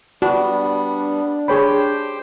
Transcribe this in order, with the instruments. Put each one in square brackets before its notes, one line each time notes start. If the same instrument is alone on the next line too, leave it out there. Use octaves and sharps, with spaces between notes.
[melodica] G3 B3 [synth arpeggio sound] D4 [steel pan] F#4
[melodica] G4 C5 G5 [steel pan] G#4 C#5 B5